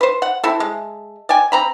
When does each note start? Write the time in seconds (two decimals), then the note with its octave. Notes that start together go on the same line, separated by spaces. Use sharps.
0.01 B4 C5
0.22 F#5
0.44 C4 E4 A4
0.60 G#3
1.29 D5 G5 G#5
1.52 C4 A#5 B5